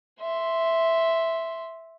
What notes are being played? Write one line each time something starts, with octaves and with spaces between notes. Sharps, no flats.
E5 C6